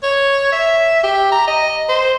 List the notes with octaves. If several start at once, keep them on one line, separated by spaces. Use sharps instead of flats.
C#5
E5
G4
A#5
D#5
C5